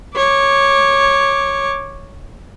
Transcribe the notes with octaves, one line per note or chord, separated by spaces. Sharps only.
C#5 D6